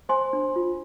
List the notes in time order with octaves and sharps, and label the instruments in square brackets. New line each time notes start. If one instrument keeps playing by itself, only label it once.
[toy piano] C5 G#5 C6
D4
F4